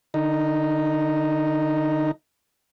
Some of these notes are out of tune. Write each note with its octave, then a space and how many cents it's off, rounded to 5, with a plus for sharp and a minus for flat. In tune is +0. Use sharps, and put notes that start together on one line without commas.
D3 +25 D#4 +0